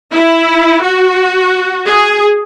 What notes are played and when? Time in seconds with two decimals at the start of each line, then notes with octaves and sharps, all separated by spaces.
0.13 E4
0.83 F#4
1.86 G#4